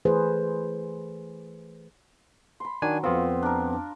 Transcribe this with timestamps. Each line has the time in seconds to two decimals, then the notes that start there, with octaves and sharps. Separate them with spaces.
0.05 E3 A3 G#4 B4 C5
2.60 B5 C6
2.82 D#3 F#3 D4 G#5
3.04 F2 B3 C4 F4
3.43 D4 A#4
3.73 D4